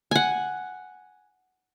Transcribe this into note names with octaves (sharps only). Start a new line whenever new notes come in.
F#5 G#5